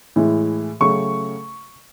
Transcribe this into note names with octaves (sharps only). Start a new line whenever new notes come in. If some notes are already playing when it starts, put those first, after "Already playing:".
A2 E3 G#3
C#3 F#3 A3 C#6